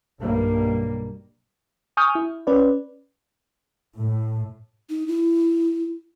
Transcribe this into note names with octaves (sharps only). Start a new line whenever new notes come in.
B1 G2 G3 A#3
G#5 C#6 D#6 F6 G6
E4
C#4 B4 D5
A2
D#4
E4